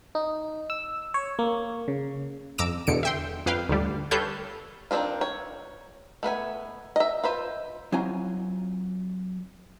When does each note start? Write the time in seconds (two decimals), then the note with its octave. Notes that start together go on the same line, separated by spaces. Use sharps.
0.15 D#4
0.70 E6
1.14 C#5
1.39 A#3
1.88 C#3
2.58 F2 A#5 D6 E6 D7
2.87 E2 B2 D3 C#7 D7
3.03 E5 G5 C6
3.46 F2 B4 F5 G5
3.69 D2 G#2 D3 G3
4.11 G4 A4 B4 C#5 F5 G6
4.91 D#3 E3 C4 D4 F4
5.21 C#5
6.23 A3 B3 B4 G#5
6.96 D#5 E5
7.24 F4 B4 C5
7.92 F#3 C4 E4 F4 G#5 A#5